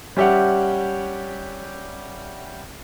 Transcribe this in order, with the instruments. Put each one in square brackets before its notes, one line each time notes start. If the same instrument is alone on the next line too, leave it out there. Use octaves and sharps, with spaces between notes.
[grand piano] G3 C#4 G4 E5 F#5